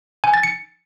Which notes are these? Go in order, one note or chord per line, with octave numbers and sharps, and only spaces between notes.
G#5
A6
C#7